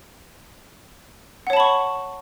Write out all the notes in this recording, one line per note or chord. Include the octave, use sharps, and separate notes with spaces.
C#5 F#5 A5 B5 C#6